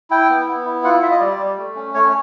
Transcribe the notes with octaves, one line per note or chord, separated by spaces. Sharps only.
E4 G5
B3
B3
E4
F4 F#5
F4 E5
D#5
G3 D5
G3
A3
C#4
A3 C#5